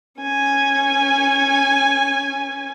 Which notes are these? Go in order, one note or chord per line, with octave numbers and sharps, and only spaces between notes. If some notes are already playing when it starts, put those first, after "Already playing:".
C#4 G#5